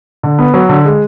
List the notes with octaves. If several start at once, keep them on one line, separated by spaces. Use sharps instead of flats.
D3
B3
F#3
D3
G#3